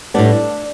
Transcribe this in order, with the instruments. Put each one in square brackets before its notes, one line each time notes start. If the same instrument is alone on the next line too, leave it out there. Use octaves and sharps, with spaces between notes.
[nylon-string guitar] A2 G3 B3 D4